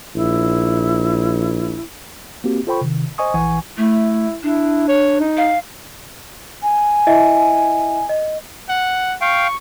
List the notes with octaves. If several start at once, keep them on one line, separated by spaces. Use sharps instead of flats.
A#1 E4
A#3 C4 F#4 G4
F4 A4 C5 G5 B5 C#6
C3 D#3
C5 D#5 G#5 C#6 D#6
A#1 E3 F#5 G#5 C#6
A3 E4
D4 E4
C#5
D#4
F5
G#5
E4 D#5 E5
D#5
F#5
F5 G5 C#6